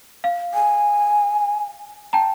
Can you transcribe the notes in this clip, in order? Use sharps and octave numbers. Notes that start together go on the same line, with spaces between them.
F5
G#5
G5 A5 A#5